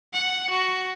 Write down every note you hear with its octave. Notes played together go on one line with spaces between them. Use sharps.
F#5
F#4